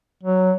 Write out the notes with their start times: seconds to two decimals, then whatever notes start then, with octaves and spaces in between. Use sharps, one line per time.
0.23 F#3